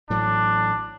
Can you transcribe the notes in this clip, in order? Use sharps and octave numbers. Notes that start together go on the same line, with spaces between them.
A1 A2 F#3 D4